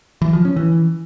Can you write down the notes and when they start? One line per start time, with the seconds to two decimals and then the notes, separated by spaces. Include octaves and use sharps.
0.22 E3
0.33 F3
0.45 C#4
0.56 E3